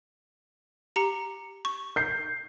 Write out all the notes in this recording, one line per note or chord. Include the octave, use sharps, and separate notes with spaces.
G4 A#5 C#7
C#6
G6 C7